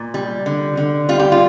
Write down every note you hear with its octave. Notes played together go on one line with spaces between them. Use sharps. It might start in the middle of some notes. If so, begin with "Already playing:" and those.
Already playing: A#2
G3
D3
D3
G3 F4
G4
F4